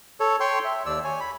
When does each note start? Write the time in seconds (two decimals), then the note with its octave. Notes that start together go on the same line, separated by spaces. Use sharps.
0.20 A4 C#5
0.40 C#5 G5 C6 C#6
0.65 E5
0.86 D#2 D5 E6
1.04 C#5 G#5
1.20 B5